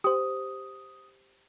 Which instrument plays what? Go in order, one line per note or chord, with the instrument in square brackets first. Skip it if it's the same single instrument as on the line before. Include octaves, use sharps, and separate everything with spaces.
[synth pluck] G4 C5 [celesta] D#6